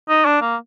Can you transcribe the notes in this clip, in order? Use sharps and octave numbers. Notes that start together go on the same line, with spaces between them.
D#4
D4
A#3